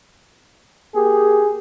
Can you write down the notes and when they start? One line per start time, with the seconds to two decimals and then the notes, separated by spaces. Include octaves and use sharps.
0.95 A#3 G4 G#4